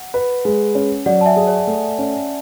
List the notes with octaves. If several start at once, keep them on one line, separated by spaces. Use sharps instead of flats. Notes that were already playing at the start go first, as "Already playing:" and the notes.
Already playing: F#5
B4
G#3
C#4
F#3 D5 F#5
A5
E5 G#5
G#4
C#5
A3
C#4